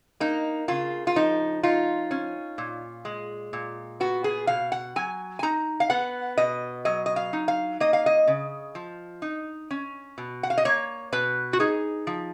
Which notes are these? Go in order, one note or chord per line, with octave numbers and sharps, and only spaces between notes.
A#3 D#4
C#3 F4
F4
F3 D#4
D#4 F4
C#4
A#2
G#3
A#2
B3 F#4
G#4
B2 F5
F#5
F#3 G#5
G#5
D#4 A#5
F5
B3 F#5
B2 D#5
F#3 D#5
D#5
F5
D#4
F5
A#3 D#5
F5
D#5
C#3
F3
D#4
C#4
B2
F#5
F5
D#5
A#3 C#5
B2 B4
F#4
D#4 G#4
F3